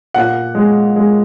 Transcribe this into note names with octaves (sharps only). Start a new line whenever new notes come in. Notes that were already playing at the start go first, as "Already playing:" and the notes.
A#2 F#5
G#3
G#3